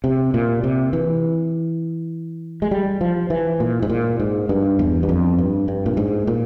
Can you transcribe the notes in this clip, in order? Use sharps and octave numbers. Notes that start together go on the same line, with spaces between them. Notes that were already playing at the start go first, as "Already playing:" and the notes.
C3
A#2
C3
E3
G#3
G3
F3
E3
A#2
G#2
A#2
G#2
G2
E2
G2
F2
G2
G2
A#2
G#2
A#2